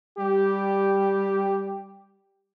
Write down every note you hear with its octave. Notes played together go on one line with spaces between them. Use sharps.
G3 G4